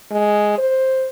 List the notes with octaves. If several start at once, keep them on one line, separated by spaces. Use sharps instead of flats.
G#3
C5